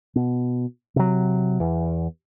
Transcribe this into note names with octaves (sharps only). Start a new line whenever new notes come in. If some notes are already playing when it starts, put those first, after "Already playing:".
B2
C3 F#3
E2